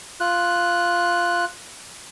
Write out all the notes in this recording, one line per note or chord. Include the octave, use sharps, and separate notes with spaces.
F4 F#6